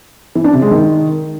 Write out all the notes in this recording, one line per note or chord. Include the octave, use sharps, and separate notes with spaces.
E3
D4
C3
G#3
D#3